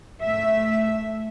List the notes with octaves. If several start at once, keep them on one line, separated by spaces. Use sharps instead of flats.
A3 E5